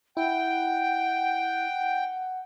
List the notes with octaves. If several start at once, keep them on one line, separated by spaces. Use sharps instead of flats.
E4 F#5 G5